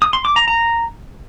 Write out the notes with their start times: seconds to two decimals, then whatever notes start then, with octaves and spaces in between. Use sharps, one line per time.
0.02 D#6
0.13 C6
0.25 D6
0.36 A#5
0.48 A#5